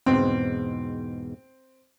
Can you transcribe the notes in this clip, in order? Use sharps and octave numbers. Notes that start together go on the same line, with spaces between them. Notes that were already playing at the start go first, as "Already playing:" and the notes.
E2 G#2 B2 C4